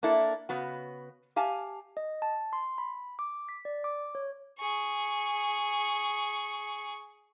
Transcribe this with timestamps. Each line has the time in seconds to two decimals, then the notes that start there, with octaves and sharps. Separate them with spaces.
0.03 A#3 D4 E4 A4
0.49 C#3 B3 F#4
1.36 G4 F5 G#5 A5
1.97 D#5
2.22 A5
2.53 C6
2.78 B5
3.19 D6
3.49 B6
3.65 D5
3.84 D6
4.15 C#5
4.59 G#4 C#6